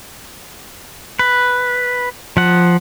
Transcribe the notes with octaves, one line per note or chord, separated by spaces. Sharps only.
B4
F3 F#5